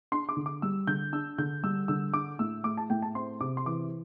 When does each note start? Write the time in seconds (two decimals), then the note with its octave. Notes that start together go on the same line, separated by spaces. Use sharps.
0.12 D4 C6
0.29 D6
0.37 D3
0.46 D6
0.62 G3 E6
0.87 D3 G6
1.12 D4 E6
1.38 D3 G6
1.63 G3 E6
1.88 D3 E6
2.13 D4 D6
2.39 A2 E6
2.64 A3 D6
2.77 A5
2.90 A2 G5
3.02 A5
3.15 C4 C6
3.40 C3 D6
3.57 C6
3.65 E3 D6